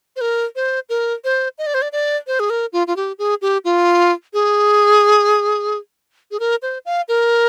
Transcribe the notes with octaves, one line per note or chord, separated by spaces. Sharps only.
C5
A#4
C5
A#4
C5
D#5
D5
C5
D5
D5
C5
G#4
A#4
F4
F4
G4
G#4
G4
F4
G#4
G#4
A#4
C5
F5
A#4